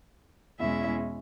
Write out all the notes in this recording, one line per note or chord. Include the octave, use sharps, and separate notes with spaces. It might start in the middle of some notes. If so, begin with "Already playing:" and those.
E2 B2 G#3 C#4 E4 E5